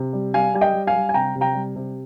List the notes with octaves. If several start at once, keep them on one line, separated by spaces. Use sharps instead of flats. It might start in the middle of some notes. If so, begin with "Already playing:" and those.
Already playing: C3
G3
G3 F5 G#5
G3 G#5
D#5 G5
G3
F5 G#5
G3
G#5
C3 G5 A#5
C3
G5 A#5
G3
C3